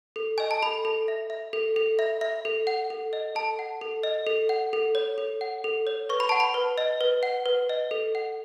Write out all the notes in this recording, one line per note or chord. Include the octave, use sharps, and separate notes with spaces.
A4
D#5 G#5
A5
A4 B5
A4
E5
E5
A4
A4
E5
E5
A4
F#5
A4
D#5
A4 A5
F#5
A4
D#5
A4
F#5
A4
C#5
A4
F#5
A4
C#5
B4 C#6
B5
F#5 A5
B5
B4
D#5
B4
F#5
B4
D#5
A4
F#5